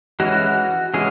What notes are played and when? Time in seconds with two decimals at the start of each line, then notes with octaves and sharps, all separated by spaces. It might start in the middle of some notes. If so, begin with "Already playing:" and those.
0.20 E3 G#3 C#4 F#4
0.94 E3 G#3 C#4 G#4